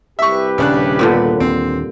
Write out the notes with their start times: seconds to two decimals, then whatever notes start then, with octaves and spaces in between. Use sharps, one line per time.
0.19 C2 G4 B4 E5 C#6
0.58 D#1 C#3 D4 F#6
0.99 G2 A#2 D3 B3
1.40 D#2 A3 C4 D4